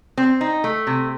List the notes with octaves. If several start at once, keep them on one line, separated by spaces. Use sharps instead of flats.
C4
D#4
A3
C3